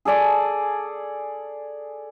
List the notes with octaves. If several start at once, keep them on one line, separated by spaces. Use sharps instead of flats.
G#4 A4 D5 G#5